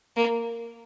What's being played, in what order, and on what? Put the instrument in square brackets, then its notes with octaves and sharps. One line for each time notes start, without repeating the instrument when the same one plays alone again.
[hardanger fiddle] A#3